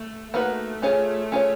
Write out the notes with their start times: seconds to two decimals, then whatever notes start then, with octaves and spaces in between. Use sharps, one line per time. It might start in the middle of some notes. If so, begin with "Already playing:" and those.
Already playing: A3
0.34 A3 A#3 D#4 F#4 B4
0.82 C#4 F4 G#4 C#5
1.32 C#4 F4 G#4 C#5